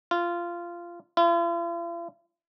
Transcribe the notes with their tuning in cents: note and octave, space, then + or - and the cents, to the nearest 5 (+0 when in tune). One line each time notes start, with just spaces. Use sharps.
F4 -15
F4 -45